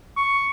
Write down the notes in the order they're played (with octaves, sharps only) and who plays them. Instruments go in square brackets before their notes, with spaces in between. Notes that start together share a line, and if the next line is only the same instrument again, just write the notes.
[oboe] C#6